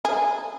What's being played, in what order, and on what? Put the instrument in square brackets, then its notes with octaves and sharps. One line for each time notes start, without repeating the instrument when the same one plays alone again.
[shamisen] G#4